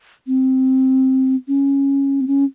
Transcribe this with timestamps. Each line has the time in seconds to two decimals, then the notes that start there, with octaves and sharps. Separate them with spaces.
0.27 C4
1.48 C#4
2.21 C4
2.27 C#4